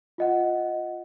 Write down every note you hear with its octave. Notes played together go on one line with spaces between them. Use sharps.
F4 D#5 F#5